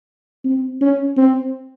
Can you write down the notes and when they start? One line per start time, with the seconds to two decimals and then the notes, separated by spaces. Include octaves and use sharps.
0.44 C4
0.81 C#4
1.16 C4